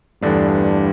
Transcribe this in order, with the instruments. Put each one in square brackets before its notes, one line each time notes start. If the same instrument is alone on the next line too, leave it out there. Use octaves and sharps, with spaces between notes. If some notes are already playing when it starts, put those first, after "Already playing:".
[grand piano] E2 D3 A3 D4 [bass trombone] G2